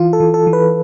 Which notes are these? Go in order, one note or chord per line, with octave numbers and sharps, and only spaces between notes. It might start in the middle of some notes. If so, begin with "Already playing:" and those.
Already playing: E3 F4
A4
E3
A4
E3
B4